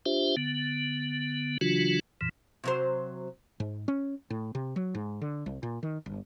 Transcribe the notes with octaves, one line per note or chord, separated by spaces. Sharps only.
D4 F4 G4 C5 E5
D3 B3
C#3 E3 F#3 D4 F4 F#4
F2 A#2 E3
C3 F#3 C5
G#2
C#4
A2
C3
F#3
G#2
D3
C2
A#2
D#3
G1